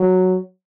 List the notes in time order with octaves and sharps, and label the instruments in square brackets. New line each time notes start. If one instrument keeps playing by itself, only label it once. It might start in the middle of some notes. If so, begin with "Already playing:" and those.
Already playing: [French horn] F#3